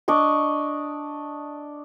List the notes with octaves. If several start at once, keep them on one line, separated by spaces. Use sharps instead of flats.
D4 D5 D#5 C#6